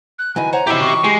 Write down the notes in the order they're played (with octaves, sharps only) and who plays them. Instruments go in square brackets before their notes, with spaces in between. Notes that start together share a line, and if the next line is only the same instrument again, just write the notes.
[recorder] F#6
[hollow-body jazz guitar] D#3 E3 F#3 [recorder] G#5
[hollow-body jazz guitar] C5 C#5 F#5 [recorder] A#5
[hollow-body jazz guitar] D#3 F#3 E4 [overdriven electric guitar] G4 E5
[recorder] C#6
[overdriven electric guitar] G#3 [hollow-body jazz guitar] G4